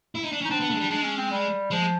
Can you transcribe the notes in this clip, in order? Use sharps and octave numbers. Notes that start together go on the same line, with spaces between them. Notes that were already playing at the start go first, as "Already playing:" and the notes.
E4
D#4
D4
C#4 D#4
C4 D4
B3
A3
G#3
G3
G#3 D4
C#4
C4
G3
F3 G#3